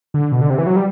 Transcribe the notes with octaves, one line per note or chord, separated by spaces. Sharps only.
D3
B2
D3
C3
E3
F#3
G3